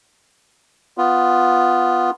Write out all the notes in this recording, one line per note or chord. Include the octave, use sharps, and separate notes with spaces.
B3 F4